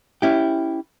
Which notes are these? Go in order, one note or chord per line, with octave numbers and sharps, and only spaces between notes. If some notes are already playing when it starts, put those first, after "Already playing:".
C#4 E4 G4